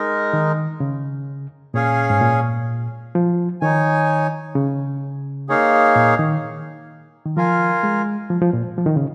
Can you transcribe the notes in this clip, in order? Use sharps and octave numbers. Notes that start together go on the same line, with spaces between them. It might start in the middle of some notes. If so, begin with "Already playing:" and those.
Already playing: G#3 D#4 A#4 D#5
D#3
C#3
A#2 C#4 G#4 C#5 F5 G#5
G#2
A#2
F3
D#3 D#4 C#5 G#5
C#3
A#3 D#4 G#4 C#5 F5
A#2
D#3
D#3
F3 F4 A#4 F5 G#5
G#3
F3
F3
A#2
F3
D#3
C#3